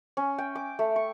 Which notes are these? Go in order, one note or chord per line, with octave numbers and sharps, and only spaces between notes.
C#4
G5
D6
A3
C#6